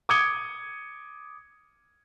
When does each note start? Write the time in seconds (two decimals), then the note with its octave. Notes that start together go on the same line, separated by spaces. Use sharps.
0.09 D6 D#6 G#6 C#7 G7